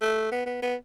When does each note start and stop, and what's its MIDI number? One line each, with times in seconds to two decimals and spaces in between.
0.02 0.29 57
0.32 0.44 59
0.46 0.57 59
0.62 0.75 59